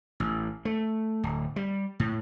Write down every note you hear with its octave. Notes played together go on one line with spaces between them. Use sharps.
A1
A3
D1
G3
A2